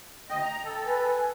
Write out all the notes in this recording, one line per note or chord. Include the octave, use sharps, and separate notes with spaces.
D2 D#5 G5
A#5
A4
B4 G#5
G#5